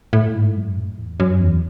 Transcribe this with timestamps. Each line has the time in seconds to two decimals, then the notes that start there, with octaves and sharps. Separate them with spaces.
0.13 A2
0.34 G#2
0.56 F#2
0.77 A2
0.98 E2
1.20 F#2
1.40 E2